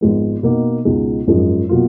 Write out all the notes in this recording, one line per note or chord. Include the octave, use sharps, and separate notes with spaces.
G#1 G#2 F3 G#3 B3
B2 A#3 D#4
C#2 B2 G#3 D#4
G#1 F#2 F3 G#3
B2 F#3 A#3 F4